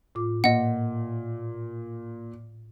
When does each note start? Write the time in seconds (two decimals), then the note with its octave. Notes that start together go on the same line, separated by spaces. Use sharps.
0.15 A2 F4 D6
0.44 A#2 D#5 F#5